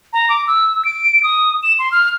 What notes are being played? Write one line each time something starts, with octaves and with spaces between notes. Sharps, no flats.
A#5
D6
E6
D7
D#6
E7
C6
F6